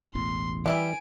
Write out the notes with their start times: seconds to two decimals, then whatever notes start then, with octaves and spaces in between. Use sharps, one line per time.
0.15 E1 A1 E2 C6
0.66 E3 G3 E4 E5 G#5 D7